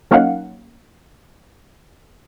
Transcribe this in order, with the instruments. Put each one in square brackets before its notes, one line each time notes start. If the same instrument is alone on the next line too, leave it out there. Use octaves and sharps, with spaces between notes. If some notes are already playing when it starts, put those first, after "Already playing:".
[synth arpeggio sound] F#3 A#3 C#4 D#4 F5 F#5